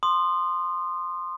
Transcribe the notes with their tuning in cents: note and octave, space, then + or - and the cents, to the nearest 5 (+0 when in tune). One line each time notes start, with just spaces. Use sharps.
C6 +0 D#6 -25